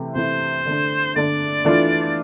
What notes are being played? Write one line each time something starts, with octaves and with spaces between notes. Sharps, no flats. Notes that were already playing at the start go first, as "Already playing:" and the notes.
Already playing: C3 E3 A3 E4
C3 E3 A3 E4 C5
D3 A3 D4
D3 A3 D4 D5
E3 A3 D4 F4